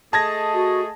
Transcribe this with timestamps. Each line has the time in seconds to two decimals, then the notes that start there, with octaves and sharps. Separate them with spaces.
0.13 A3 G#4 D#5 A5 G#6 A#6
0.54 F#4